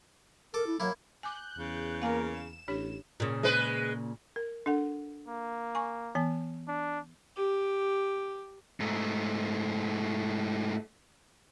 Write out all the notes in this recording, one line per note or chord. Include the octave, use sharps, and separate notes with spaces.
A4 A#4 D6
E4
F#3 A#3 E4
G#5 D6 F#6 G6
E2 C#3
A#3 A#4 F5 G#5
E7
A1 D4 G4 C#5
A#2 C#3
G#3 B4
A#4
D4 A4 F#5
A#3
G#5 C#6
E3 B3 A5
D4
G4
G#2 A3